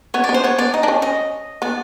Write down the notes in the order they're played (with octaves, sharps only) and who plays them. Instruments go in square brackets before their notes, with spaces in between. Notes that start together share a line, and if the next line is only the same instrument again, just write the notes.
[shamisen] B3 [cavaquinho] C#5
[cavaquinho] D5
[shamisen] B3
[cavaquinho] C5
[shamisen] B3 [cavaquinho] C#5
[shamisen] B3 [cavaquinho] D5
[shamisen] D#4 [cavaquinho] D#5
[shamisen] D4
C#4
[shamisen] C#4 [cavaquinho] D#5
[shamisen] B3 [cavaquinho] D5